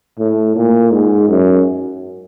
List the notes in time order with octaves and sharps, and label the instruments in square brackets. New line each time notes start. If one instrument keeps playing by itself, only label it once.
[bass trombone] A2
A#2
G#2
F#2